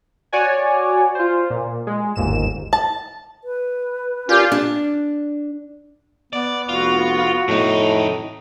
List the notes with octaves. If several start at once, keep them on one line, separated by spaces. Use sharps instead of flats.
F#4 C#5 D5 G#5
F4 C5
A#2
G#3
G1 D#2 G#2 E7
A5
B4
A#2 C#4 F4 G4
D4
B3 D5
F1 F4 F#4
F2 A2 D#4